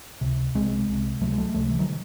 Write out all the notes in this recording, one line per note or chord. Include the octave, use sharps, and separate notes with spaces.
C#2 C3
C2 C3 G#3 C4
C2
C3
C#2 C3 F#3 A3
G#3
F#3 A3
C#2 C3 F#3 A3
E3
D#3 F#3